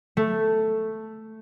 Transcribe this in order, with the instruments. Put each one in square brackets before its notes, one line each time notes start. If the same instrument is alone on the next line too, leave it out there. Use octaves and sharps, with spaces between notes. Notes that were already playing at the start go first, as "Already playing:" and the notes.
[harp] A3